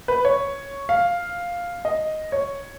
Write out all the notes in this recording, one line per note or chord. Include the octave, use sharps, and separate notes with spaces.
B4
C#5
F5
D#5
C#5